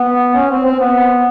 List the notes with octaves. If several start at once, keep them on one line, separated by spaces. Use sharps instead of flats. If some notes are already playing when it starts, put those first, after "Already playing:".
Already playing: B3
C#4
C4
C4
B3